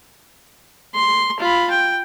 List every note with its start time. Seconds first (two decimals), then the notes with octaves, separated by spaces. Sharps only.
0.94 C6
1.39 F4 B5
1.70 G5